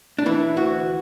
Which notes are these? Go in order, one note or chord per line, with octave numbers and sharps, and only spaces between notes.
D4
E3 E4
D2 F#4